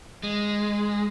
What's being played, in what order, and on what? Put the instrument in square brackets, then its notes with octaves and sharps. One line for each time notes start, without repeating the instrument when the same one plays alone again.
[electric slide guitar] G#3